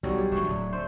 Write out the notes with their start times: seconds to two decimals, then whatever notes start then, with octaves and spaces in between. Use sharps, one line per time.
0.03 B1 D3 F#3 G3
0.18 G4 G#4
0.32 E1 D2 G2 F#4 C#5 E5
0.45 D1 F#3 D4
0.73 A3 C4 C5